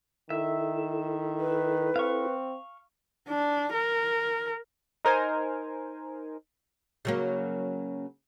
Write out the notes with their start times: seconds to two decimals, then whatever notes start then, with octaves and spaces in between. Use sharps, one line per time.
0.30 D#3 E4 A4 E5
1.40 B4
1.96 C4 F5 C#6
3.28 D4
3.74 A#4
5.05 D#4 A#4 C5 G#5
7.05 C#3 F#3 A#3